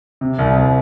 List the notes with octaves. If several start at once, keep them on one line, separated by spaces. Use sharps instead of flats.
C3
C2
C2